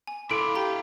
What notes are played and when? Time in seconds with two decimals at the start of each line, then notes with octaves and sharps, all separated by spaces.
0.07 G#5
0.31 E4 A4 F5 B5 C6 D6 D7
0.55 G4 A#5 C6